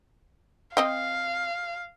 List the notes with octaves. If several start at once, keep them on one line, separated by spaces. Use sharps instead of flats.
C4 D#5 F5 G5